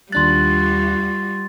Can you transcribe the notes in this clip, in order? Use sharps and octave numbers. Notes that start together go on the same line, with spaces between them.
D#2 G3 D4 F4 F#4 C6 F#6 A6